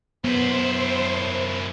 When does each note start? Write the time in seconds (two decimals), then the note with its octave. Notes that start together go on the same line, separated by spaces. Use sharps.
0.24 F#2 B3 E4 C5